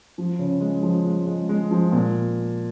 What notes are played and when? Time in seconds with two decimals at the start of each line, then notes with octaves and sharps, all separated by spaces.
0.18 F3
0.39 C#3
0.61 G#3
0.82 F3
1.05 G#3
1.27 G#3
1.49 G#3
1.71 F3
1.92 A#2